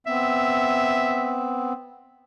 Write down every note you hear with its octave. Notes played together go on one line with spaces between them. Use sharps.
B3 C4 E5